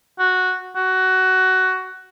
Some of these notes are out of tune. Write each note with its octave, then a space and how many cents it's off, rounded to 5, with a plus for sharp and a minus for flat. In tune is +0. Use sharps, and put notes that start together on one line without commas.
F#4 -5
F#4 +15